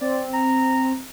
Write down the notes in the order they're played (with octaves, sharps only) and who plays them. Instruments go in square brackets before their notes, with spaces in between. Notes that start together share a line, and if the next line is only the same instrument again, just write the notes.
[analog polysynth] C4 [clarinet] D5
[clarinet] A#5